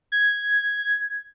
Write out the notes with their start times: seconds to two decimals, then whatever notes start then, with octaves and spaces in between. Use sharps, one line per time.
0.12 G#6